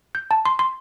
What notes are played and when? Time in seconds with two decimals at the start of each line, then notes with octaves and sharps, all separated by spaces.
0.15 G6
0.31 A5
0.46 C6
0.59 C6